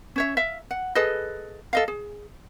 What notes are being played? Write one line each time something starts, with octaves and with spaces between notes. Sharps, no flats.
C#4 C#5 E5
E5 F5
F#5
G#4 A4 B4 D#5
A4 D#5 F5
G#4